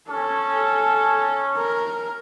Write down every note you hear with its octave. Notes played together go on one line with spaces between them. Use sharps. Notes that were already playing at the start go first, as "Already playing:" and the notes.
C#4 A4
A#4